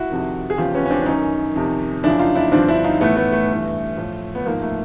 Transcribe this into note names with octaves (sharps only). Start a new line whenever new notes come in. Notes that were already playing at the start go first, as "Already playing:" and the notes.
Already playing: E4 F#4
F2 C3 D#3
G#4
E2 C#3 F3 F4 G4
B3 C#4
C#4
C4 D4
D4
F#2 D#3 C#4 D#4
F2 C3 D#3
F#2 C#3 F3 D4 E4
D#4 F4
D4 E4
G2 D3 F3 C4 D4
D4 E4
D#4 F4
A2 E3 A3 B3
A3 B3
A3
G2 E3
A2 F3
B3
G#2 F3 A#3
A3